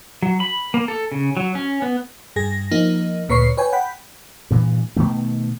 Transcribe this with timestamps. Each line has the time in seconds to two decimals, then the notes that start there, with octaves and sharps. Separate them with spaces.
0.22 F#3
0.40 B5
0.74 A#3
0.88 A4
1.12 C#3
1.37 F#3
1.55 C#4
1.82 B3
2.36 G2 G#4 A#6
2.71 F3 A#3 D#4
3.29 D2 A#2 B4 C#5 C#6 C7
3.57 B4 C#5 G5 G#5
3.73 F#5 G5 B5
4.51 G2 A#2 E3
4.96 B2 D#3 A3 B3